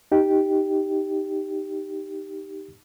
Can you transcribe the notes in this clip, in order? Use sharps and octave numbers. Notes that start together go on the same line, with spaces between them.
D#4 G4